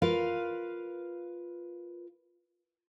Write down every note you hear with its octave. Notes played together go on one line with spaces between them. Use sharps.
F4 A#4 B4 F5